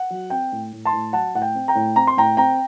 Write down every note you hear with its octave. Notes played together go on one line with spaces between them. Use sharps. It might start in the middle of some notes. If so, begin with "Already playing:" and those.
Already playing: F#5
F#3
C4 G5
A2
A2
A5 C6
A2
F#3 F#5 A5
A2 F#5
G5
C4
G5 A#5
A2
C4 A#5
C6
A2 G5 A#5
C4 G5 A#5